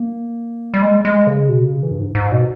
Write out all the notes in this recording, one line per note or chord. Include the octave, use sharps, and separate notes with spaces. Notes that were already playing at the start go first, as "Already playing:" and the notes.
Already playing: A#3
G3
G#3
G#3
C#3
B2
C#3
E3
G2
G#2
G#2
B2